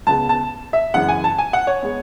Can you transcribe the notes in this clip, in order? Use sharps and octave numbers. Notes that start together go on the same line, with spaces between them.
C#2 C#3 G#3 B3 A5
A5
E5
F#2 C#3 E3 G#3 F#5
G#5
A5
G#5
F#5
C#5
G#3 B3